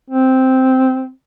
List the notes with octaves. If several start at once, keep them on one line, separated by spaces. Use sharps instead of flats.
C4